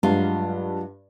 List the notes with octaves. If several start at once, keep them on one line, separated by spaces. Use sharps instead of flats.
G2 F#3 G#3 F4